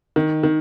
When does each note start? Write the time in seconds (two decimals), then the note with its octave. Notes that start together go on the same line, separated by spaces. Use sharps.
0.16 D#3
0.43 D#3